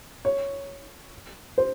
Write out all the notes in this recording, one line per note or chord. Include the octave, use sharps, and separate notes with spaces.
C#5
C5